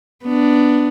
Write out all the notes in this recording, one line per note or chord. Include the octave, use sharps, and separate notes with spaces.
B3 D4